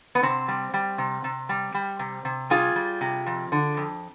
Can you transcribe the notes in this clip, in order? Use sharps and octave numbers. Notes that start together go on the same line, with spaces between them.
B3
C3 C4
G3
G3
C3
C3
G3
G3
C3
C3
G3 F4 G#4
G3
C3
F2
D3
F2